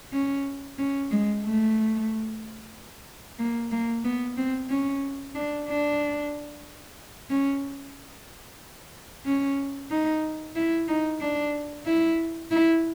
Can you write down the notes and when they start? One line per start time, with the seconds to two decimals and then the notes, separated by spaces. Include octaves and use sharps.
0.13 C#4
0.79 C#4
1.11 G#3
1.43 A3
3.39 A#3
3.71 A#3
4.04 B3
4.37 C4
4.69 C#4
5.35 D4
5.67 D4
7.30 C#4
9.26 C#4
9.91 D#4
10.56 E4
10.88 D#4
11.21 D4
11.86 E4
12.51 E4